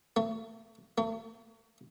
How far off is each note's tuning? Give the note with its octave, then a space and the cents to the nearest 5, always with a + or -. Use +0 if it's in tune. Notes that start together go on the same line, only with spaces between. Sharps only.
A3 +35
A3 +45